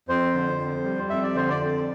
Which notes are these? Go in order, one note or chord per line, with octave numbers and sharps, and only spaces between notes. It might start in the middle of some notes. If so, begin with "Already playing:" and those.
F2 C5
D3
F2
G3
F2 E5
D5
D3 C5
D5
F2